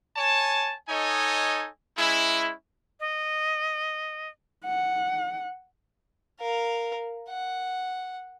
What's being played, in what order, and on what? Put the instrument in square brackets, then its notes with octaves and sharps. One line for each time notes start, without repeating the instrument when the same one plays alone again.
[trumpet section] C#5 G#5 A5
D#4 A4 C#5 D#5 G#5
G#3 C#4 E4
[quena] D#5
[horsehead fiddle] F#5
[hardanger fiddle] A#4 F5
F#5